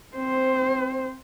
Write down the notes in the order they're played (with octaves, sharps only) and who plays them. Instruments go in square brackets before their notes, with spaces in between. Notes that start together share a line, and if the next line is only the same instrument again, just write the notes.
[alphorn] C4 [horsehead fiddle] C5